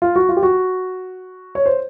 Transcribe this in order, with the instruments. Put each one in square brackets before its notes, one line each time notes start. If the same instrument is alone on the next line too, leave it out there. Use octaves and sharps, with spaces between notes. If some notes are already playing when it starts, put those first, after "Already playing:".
[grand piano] F4
F#4
F4
G4
F#4
C#5
C5